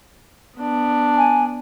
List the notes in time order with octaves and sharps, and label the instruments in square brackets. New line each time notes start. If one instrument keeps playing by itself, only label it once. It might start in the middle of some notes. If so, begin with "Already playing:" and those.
[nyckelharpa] B3 D4
[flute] G#5